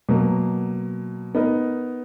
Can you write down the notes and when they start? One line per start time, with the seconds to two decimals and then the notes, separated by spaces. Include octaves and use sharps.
0.09 B2 F#3 A#3
1.35 B3 D#4 A#4